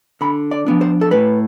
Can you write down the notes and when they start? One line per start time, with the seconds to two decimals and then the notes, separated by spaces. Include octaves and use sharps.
0.21 D3 B5
0.51 D5
0.66 F3 B3 D4
0.81 C5
1.01 A4
1.11 A2 B4